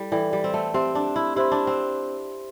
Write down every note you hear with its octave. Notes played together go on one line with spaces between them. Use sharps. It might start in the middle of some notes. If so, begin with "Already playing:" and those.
Already playing: G3 E4 A4 D5 G5
E3 E4 A4 D5 G5
G3
C4
A3
C4 G4 C5 E5 C6
D4
E4
E4 G4 C5 E5 C6
D4
C4